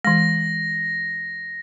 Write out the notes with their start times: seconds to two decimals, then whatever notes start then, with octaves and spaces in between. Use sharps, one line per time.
0.05 E3 G#3 A#6